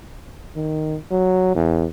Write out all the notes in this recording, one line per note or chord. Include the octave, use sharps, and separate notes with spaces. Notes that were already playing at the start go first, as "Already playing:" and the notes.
D#3
F#3
E2